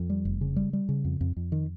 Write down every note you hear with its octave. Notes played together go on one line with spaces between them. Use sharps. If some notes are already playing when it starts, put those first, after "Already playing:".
Already playing: F2
G3
F1
C#3
G3
G3
C#3
F2
F2
F2
D#3